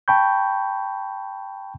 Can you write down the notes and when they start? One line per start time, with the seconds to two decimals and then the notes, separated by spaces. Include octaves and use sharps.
0.08 G5 A5 B5 C#6 G6